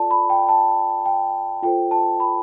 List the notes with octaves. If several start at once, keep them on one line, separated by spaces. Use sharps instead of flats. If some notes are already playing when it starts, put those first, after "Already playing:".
Already playing: F4 A4 D5 A5
B5
G5
A5
G5
F4 A4 C5 G5
A5
B5